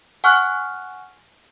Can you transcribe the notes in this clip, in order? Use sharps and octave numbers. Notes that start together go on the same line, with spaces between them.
F#5 G#5 C#6 F6 F#6